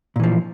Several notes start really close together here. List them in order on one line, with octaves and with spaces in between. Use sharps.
A#2 E3 F3